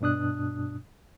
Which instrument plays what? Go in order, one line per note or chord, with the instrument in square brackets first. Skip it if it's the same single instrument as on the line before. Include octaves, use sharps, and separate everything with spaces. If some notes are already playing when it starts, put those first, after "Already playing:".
[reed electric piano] G2 B2 D4 D#6 F#6